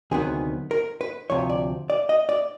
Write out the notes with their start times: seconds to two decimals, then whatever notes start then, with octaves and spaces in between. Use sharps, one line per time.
0.11 D2 C3 D#3 F#3 B3 G#4
0.71 A#4
1.01 B4
1.30 D2 C3 F3 C#5
1.50 D5
1.90 D5
2.09 D#5
2.29 D5